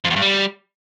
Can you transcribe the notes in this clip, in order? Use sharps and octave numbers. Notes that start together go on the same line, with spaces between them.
F2
E2
G2
G3